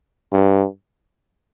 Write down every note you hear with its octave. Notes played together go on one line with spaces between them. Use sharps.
G2